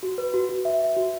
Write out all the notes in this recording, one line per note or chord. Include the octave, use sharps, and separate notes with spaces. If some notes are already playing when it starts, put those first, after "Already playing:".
F#4
B4
F#4
F#4
E5
E5
F#4